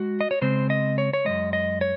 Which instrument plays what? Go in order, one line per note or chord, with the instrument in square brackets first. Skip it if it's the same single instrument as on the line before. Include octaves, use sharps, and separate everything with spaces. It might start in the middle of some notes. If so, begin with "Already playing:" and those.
Already playing: [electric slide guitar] G#3 F#4
D#5
C#5
C#3 G#3 C4 C5
D#5
C#5
C#5
F#2 F3 G#3 D#5
D#5
C#5